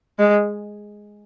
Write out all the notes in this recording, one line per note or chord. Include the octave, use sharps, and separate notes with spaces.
G#3